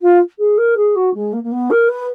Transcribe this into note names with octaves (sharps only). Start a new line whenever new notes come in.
F4
G#4
A#4
G#4
F#4
G#3
A#3
A#3
B3
A#4
B4